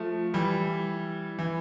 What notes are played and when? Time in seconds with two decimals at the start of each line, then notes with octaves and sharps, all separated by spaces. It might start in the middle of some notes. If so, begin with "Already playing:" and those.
Already playing: F3 A3
0.34 E3 G3
1.39 E3